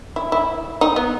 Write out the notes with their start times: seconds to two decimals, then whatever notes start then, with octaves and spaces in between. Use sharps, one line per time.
0.16 E4
0.32 E4
0.81 D#4
0.96 B3